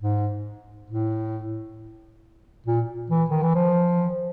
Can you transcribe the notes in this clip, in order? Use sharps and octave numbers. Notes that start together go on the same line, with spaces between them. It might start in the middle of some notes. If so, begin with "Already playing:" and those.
G#2
A2
A#2
E3
D#3
E3
F3